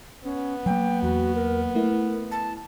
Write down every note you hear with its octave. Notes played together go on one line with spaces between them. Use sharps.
B3 C#4
F#3 A#3 G5
E2 F#4
A#4
A3 E4 A#4
A5